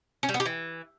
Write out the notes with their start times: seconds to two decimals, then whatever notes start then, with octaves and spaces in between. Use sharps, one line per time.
0.23 C#4
0.29 G3
0.34 B3
0.40 G4
0.45 E3